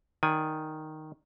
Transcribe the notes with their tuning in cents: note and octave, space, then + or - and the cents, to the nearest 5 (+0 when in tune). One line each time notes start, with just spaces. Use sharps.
D#3 +0 D5 +0 G#5 +0